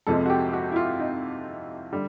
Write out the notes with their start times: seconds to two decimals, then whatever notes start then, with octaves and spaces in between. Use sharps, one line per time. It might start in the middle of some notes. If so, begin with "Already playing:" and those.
0.07 F2 C3 F3 G#3 A4
0.26 F#4
0.30 G4
0.53 F#4
0.72 E4
0.76 F4
0.99 D#4
1.93 D3 G3